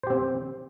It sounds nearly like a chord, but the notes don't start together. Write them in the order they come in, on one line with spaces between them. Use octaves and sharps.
C5 G4 C4